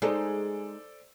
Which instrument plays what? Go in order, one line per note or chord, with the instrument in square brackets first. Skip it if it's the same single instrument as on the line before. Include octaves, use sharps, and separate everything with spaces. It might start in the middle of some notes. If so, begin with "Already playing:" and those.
[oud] G#3 D#4 [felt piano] A4 C5 D5